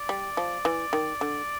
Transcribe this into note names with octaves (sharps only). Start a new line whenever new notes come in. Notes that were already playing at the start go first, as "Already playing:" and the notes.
Already playing: D5
G3
F3
E3
D#3
D3